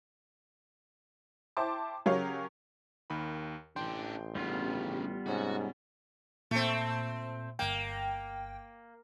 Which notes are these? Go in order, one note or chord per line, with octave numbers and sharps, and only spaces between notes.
E4 C5 G5 A5 C6 D6
C#3 F#3 G4 A#4 C#5 F5
D#2 D#3 B5
A1 E3 D4 G5 C6 G6
G2 C#3 G3 B3 F4
G#2 C3 C#4 F#4
A#2 A3 C4
G1 A#3 G5